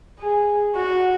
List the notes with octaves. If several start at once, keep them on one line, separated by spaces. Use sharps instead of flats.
G#4
F#4